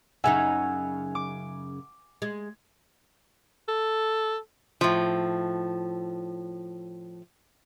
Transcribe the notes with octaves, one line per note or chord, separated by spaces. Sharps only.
F#2 C#3 D#4 E5 F#5 G#5
D6
G#3
A4
A2 F3